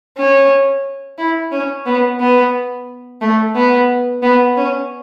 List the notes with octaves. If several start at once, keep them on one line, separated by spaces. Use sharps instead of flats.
C#4
E4
C#4
B3
B3
A3
B3
B3
C#4